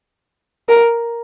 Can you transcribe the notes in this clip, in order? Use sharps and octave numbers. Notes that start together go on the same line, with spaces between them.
A#4